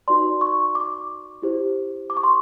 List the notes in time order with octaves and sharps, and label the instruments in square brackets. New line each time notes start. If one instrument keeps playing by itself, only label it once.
[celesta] D#4 F#4 B4 D5 C6
C#6
D6
E4 G4 C5
D6
C#6
C6